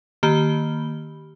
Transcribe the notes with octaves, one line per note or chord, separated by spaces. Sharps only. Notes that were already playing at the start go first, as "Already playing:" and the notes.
D#3 A#3 G4 B5 G7